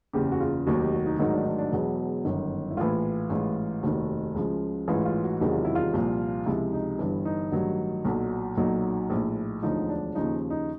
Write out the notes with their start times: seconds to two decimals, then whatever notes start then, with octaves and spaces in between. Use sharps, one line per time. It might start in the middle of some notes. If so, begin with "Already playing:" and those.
0.13 F#1 E2 C#3 G4
0.32 F#4
0.41 F4
0.66 F1 D#2 D#3 F#3 F#4
0.80 G4
0.93 F#4
1.06 D#4
1.19 A1 G#2 D#3 F#3 D#4
1.33 D4
1.41 D#4
1.46 D4
1.58 D4
1.72 E1 E2 B2 F#3
2.25 G1 F#2 D#3
2.71 E4
2.77 A#1 A2 E3 F4
3.30 A1 G#2 E3
3.83 F1 D#2 D#3 F#4
4.35 C#2 C#3 F3
4.88 A1 G#2 E3 F4
5.06 F4
5.24 F#4
5.40 E1 E2 C3 D#3 F#3 F#4
5.53 F4
5.65 E4
5.75 F4
5.93 C2 A#2 F3
6.46 C#2 C3 F3 E4
6.73 D#4
6.99 G1 G2 E3
7.25 D#4
7.52 A1 G2 D#3 F#3
8.05 B1 A#2 F#3
8.57 B1 A#2 F#3 D#4
9.10 A#1 A2 F3
9.63 E1 D2 D3 F3 D#4
9.89 D4
10.15 D#2 C#3 F3 D#4
10.50 D#4